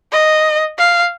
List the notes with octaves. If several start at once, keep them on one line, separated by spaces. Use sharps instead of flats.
D#5
F5